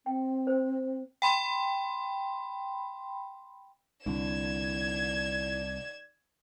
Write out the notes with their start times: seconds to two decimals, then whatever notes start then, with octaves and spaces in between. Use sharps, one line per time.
0.06 C4 G5
0.47 C5
1.22 G5 B5 C6
4.06 C2 D3 D#3 E4 D5 G#6 E7